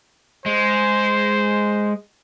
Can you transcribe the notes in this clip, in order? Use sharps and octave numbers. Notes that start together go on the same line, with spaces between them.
G#3 C5